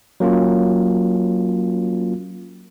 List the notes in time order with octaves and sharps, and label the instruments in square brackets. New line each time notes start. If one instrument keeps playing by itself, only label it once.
[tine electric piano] F#3 A#3 C#4 F4